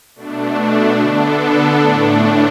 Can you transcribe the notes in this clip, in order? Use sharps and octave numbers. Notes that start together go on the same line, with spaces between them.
B2 A3 D4
D3 B3 D4 A4
A2 A3 D4